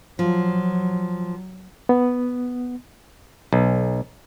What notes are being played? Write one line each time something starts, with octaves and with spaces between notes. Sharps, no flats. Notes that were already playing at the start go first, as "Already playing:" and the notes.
F3 F#3
B3
B1